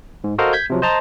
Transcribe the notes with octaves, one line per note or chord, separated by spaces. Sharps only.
G#2
F#4 A4 A#4 C5 D#5 F5
G6 G#6 B6
C3 F3 F#3
C5 D#5 A5 A#5 C6